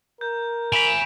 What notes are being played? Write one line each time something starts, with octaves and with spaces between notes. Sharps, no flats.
A#4 G6
G#5 B5 B6 D7